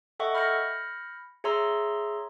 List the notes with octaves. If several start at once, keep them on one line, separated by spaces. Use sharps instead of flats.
A4 D#5 E5 F#5 G5 C#6
B5 F6 G6 A#6 C#7
G#4 C#5 E5 A#5 C6 E6